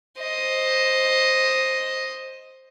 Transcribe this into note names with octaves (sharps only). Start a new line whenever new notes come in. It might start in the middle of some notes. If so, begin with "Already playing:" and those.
C5 D#5